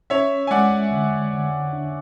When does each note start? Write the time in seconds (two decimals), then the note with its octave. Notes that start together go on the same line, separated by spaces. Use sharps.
0.10 C#4 C#5 E5
0.47 G#5
0.51 G#3 D5 F#5
0.91 D3
1.32 D3
1.73 D4